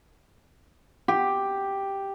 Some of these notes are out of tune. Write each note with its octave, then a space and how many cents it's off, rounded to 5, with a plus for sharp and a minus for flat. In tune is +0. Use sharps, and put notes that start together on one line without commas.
G4 +0